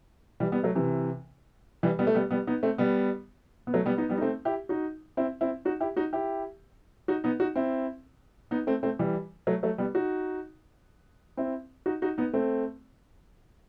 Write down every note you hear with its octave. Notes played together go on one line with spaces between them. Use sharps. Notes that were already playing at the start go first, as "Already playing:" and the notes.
E3 G3
G3 B3
F#3 A3
C3 E3
E3 G3
G3 B3
A3
G3 B3
G3 B3
B3 D#4
A3 C4
G3 B3
B3
F#3 A3
G3 B3
B3 D#4
G3 B3
D#4
A3 C4
E4 G4
D#4 F#4
C4 E4
C4 E4
D#4 F#4
E4 G4
D#4 F#4
E4 G4
D#4 F#4
B3 D#4
D#4 F#4
C4 E4
B3 D#4
A3 C4
A3 C4
E3 G3
F#3 A3
F#3 A3
G3 B3
D#4 F#4
C4 E4
D#4 F#4
D#4 F#4
B3 D#4
A3 C4